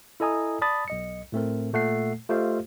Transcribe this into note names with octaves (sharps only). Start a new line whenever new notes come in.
E4 A4 D#5 G#5 A#5 D#6
D5 A5 B5 D#6 A6
B1 D#5 C#7
A2 A3 C4 A#4
A#2 A3 F#5 C7
A3 F4 G4 C5 D#5 F5